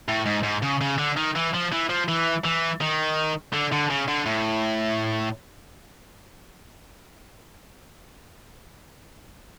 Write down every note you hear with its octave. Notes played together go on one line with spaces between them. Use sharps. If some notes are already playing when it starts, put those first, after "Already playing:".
A2
G#2
G#2
C#3
C#3
D3
D#3
E3
F3
E3
F3
E3
E3
D#3
D3
D3
C#3
D3
A2